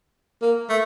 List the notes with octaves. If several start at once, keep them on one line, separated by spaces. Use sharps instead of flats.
A#3
A3